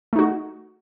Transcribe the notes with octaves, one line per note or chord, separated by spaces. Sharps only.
A3 D#4 F#4